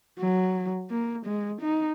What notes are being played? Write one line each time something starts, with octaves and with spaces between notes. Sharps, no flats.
F#3
A#3
G#3
D#4